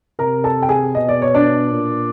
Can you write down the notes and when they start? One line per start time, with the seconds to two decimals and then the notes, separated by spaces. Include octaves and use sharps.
0.19 C3 A#4 A#5
0.44 A4 A5
0.62 G5
0.69 G#4 G#5
0.95 B2 D#5
1.09 D5
1.22 C#5
1.35 D4 D5
1.71 A#2